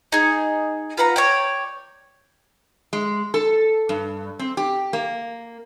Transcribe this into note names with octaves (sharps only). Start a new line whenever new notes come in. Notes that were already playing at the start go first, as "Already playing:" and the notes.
D#4 G#4
F4 B4 F#5 A#5
C#5 D5 G5
G#3
A4
G2
C4
G4
A#3